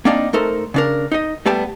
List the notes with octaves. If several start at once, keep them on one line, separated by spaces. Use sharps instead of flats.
A#3 C4 D4 D#4 D5 F5
A3 D#4 A4 A#4 C5
C#3 D4 A#4
D#4 D#5
G3 A3 B3 G4 A5